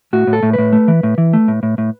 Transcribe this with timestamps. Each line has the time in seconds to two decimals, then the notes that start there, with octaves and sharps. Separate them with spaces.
0.13 A2 F#4
0.27 A2
0.33 A4
0.43 A2
0.53 B4
0.58 A2
0.73 A3
0.88 E3
1.03 A2
1.18 E3
1.33 A3
1.48 A2
1.63 A2
1.78 A2